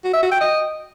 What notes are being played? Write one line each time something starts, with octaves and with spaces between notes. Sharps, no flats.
F#4
E5
F#4
G5
D#5